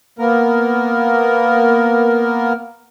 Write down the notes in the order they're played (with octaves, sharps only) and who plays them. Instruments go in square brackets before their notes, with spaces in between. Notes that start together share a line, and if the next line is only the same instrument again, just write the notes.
[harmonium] A#3 B3 A#4